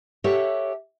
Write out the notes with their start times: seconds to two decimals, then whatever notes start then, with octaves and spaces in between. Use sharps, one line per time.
0.24 G4 A4 C#5 E5 F#5